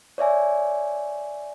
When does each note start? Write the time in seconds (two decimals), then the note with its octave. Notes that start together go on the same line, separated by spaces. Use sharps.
0.18 C#5 D5 E5 G#5